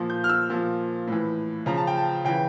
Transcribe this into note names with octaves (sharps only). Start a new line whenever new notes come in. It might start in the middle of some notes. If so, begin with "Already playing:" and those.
Already playing: A#2 F3
G6
F6
E6
A#2 F3
A2 E3
C#3 F3 A#5
A5
G5
A5
C#3 E3 G5